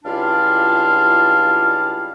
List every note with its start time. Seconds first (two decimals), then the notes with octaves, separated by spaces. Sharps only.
0.05 C#2 G3 D4 E4 F4 F5